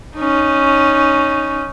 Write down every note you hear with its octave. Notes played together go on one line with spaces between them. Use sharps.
C#4 D#4